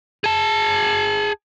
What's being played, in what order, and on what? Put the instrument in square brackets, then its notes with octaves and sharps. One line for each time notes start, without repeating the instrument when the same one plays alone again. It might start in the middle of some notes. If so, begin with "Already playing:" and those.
[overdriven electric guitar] G#4 A5